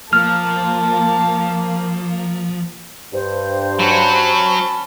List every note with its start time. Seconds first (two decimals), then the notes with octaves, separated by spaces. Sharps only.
0.13 F3 A#3 A5 F6
3.13 G2 C5
3.80 F#3 C#4 F#4 A5 B5